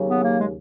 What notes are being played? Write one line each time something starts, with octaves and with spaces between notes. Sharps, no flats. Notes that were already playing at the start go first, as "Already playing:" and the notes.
Already playing: D#2 C#3 F#3
B3
A#3
G#3